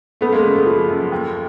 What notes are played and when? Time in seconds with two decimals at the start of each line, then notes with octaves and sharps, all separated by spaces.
0.21 F#2 A3 B3
0.32 G#3 A#3
0.43 C#3 A3
0.56 A3
0.66 F3
0.89 F#2
1.12 D#2